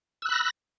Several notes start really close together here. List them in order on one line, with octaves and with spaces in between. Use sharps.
E6 F#6 B5 A#6